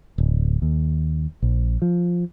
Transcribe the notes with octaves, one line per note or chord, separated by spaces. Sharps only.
D1
D#2
A#1
F3